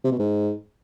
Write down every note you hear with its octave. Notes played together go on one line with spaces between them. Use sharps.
C3
B2
G#2